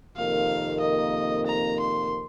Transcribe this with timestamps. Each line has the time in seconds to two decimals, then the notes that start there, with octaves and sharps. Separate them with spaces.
0.16 F2 C3 D#3 A#3 F5
0.81 D#5
1.47 A#5
1.80 C6